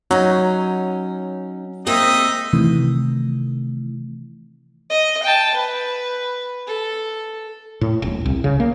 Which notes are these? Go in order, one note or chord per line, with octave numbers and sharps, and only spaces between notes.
F#3 C#4 D#4
G#3 A#3 C4 D#4 E5 D#6
C3 D#3 E3 A3
D#5
G5 A5
B4
A4
A2
D#1
C2
C#3
A#3